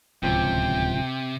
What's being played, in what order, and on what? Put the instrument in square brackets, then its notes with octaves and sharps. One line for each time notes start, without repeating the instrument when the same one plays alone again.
[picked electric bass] D1 C#2 F3 [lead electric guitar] C3 [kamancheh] G5